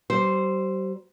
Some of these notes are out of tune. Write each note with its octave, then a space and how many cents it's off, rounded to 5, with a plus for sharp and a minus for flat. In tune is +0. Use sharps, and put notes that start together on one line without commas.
G3 -45 C5 +0